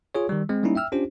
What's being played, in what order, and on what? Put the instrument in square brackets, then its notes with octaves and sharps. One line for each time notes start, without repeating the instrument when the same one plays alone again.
[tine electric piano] F4 G#4 C#5
D#3 G3
G#3 C4
G3 A#3 C#4 D#4 E4
E5 G5 E6 F6
C#4 D4 F4 G4 C5